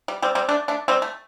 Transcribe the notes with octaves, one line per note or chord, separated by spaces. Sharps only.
G3
G3 C4
G3 C4
A3 D4
A3 D4
G3 C4
A3